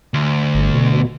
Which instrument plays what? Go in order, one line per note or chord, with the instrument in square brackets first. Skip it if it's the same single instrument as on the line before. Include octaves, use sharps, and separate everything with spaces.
[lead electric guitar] D2
[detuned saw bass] G1
B2